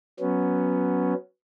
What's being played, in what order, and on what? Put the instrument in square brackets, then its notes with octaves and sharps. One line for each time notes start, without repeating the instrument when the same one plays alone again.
[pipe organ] F#3 B3 C#4